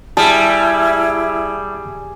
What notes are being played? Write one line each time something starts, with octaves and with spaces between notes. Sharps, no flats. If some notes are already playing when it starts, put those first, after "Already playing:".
G3 E4 G#4 A5